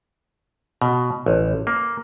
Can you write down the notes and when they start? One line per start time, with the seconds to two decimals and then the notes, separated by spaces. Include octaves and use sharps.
0.82 B2
1.26 A1
1.67 A#3